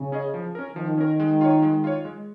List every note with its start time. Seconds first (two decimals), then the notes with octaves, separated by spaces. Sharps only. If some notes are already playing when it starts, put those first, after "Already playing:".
Already playing: C#3
0.12 C#4 G#4 D#5
0.34 F3
0.55 C#4 A#4
0.76 D#3 F3
0.98 C#4 A#4
1.20 G#3
1.41 F4 C#5
1.62 G#3
1.84 F4 C#5
2.05 G#3